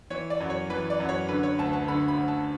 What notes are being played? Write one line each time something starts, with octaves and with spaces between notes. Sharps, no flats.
E3 C#5
D5
F#2
C#5
E3 B4
D5
F#2
C#5
D3 B4
C#5
D2 A5
A5
D3 B5
B5
D2
A5